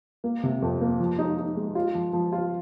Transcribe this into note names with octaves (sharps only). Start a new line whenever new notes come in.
A#3
C3
F2
A#3
F3
D#4
D#4
G#3
F4
F3
F3
F4